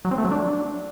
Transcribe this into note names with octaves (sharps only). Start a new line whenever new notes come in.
F#3
C4
A3
F#3
D4